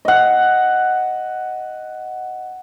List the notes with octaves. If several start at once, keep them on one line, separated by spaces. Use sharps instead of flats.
D#5 F#5